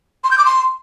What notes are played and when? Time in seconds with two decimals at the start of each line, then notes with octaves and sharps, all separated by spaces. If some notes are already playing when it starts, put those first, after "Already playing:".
0.24 C6
0.31 G6
0.38 D6
0.45 C6